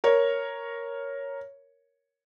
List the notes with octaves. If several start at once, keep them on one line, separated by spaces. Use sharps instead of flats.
A#4 C#5